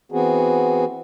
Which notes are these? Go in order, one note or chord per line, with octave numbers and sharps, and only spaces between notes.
E3 B3 C4 F#4 G#4